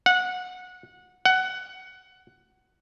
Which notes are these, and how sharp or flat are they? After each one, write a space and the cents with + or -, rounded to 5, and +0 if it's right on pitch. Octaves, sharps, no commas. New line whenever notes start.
F#5 -20
F#5 +15